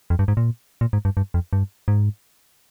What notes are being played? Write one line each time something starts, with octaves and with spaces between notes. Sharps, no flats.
F2
G2
G#2
A#2
A#2
G#2
G2
G2
F2
G2
G#2